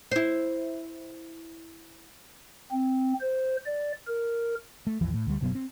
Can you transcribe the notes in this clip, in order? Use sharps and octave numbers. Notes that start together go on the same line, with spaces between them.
E4 C5
C4
C5
D5
A#4
A3
G#1 D#2 E3 F3
A2
D2 G3
F#1 B2 F#3 B3
C4